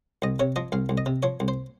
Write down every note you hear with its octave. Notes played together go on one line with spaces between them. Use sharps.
C2 D#5
C3 C#5
F3 D#5
C2 F5
C2
D#5
C3
F3 C#5
C2
C5